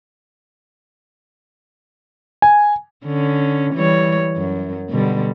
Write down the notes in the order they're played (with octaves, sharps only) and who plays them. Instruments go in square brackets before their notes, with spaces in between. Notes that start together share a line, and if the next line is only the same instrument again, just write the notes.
[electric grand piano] G#5
[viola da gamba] D3 C#4
E3 G3 C#5
F#2
B2 D3 G3